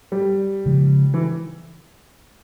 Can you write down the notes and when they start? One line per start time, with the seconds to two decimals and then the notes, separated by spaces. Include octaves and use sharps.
0.12 G3
0.66 C#3 F3 G#3
1.14 E3